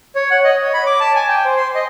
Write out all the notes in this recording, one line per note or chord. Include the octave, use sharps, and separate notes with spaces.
C#5
F#5
D#5
C#5
B5
D6
A5
G#5
G5
C5
C6
D#5